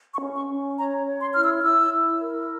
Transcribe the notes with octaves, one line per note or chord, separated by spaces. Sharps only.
C#6
C#4
C#6
C#4
C#5 A#5
C#5
C6
E4 F6
E6
E4 E6
E4
A#4